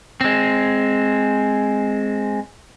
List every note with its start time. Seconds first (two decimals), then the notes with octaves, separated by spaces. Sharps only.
0.21 G#3 C4